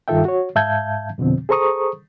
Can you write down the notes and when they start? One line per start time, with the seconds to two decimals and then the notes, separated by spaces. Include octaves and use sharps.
0.08 G2 D#3 F4 A4 E5 G5
0.25 F#4 C#5
0.55 G#2 E5 F5 A5 G6 G#6
1.18 F2 B2 D3 F3 C4
1.49 G#4 A4 C5 A#5 C#6 D#6